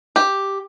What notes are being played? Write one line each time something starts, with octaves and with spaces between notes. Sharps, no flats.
G4